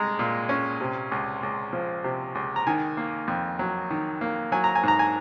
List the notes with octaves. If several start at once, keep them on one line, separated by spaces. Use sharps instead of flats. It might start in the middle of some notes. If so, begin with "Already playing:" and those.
Already playing: C2 G#3 A#5
A#2
C#4
C3
C#2
C#2
F3
C3
C#2
A#5
D#3 G#5
A#3
F2
F#3
D#3
A#3
F#3 G#5
A#5
G#5
G#2 A#5
G#5